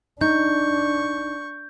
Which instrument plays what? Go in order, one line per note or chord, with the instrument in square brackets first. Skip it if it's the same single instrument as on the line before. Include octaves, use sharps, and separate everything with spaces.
[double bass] D4 [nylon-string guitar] D#4 [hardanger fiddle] C#6 [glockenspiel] G6